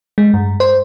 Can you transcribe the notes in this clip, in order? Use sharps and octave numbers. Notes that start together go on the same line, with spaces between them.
G#3
G2
C5